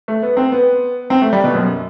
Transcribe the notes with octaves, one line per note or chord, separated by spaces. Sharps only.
A3
B3
C4
B3
C4
A3
G3
B2
F#2